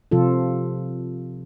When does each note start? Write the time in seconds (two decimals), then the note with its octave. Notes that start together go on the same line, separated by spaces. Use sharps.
0.11 C3 F3 F4 A4